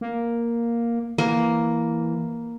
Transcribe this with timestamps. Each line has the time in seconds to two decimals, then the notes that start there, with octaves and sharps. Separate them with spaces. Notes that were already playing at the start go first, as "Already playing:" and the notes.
0.01 A#3
1.18 E3 A#3